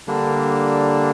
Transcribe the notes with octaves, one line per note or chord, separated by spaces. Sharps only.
D3 G3 A#3 D4